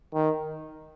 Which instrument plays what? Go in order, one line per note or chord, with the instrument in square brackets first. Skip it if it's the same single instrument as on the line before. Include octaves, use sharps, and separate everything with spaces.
[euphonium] D#3